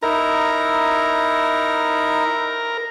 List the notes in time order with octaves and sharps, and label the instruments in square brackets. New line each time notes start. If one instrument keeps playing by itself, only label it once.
[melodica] D#4 E4 [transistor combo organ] A#4